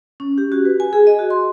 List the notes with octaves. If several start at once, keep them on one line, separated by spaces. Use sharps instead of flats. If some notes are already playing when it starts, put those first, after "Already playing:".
C#4
G4
F#4
B4
G#5
G#4
D#5
F#4
C6